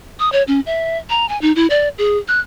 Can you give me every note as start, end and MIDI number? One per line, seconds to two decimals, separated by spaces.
0.20 0.31 87
0.32 0.43 73
0.48 0.60 61
0.66 0.98 76
1.10 1.28 82
1.29 1.40 80
1.42 1.52 63
1.56 1.67 64
1.70 1.88 74
1.98 2.17 68
2.28 2.40 90